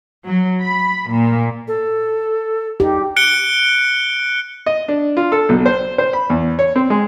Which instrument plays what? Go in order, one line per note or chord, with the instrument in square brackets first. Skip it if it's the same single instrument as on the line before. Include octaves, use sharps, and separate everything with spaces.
[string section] F#3
B5
A#2
[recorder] A4
[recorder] D#4 [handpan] G4
[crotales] F#6 C#7 D7 G7
[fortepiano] D#5
D4
F4
A4
B1
C5
C5
B5
E2
C#5
C4
G#3